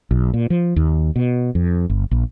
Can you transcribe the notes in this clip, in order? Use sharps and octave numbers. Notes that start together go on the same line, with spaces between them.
B1
A#2
F3
D#2
B2
F2
G1
A#1